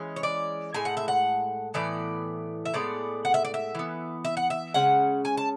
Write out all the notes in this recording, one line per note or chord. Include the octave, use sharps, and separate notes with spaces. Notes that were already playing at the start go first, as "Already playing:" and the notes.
Already playing: E3 G#3 C#4
C#5
D5
A2 G#3 G#5
F#5
E5
F#5
A2 E3 B3 D5
E5
A2 G#3 B3 D5
F#5
E5
D5
E5
E3 B3
E5
F#5
E5
C#3 G#3 C#4 F#5
G#5
A5